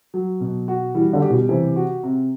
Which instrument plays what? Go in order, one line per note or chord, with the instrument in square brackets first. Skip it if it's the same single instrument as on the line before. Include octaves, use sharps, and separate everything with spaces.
[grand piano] F#3
B2
F#4
[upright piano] E3 [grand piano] G3
[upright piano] D3
[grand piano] G4
[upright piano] B2
[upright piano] C3 [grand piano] E3
[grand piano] F#4
C3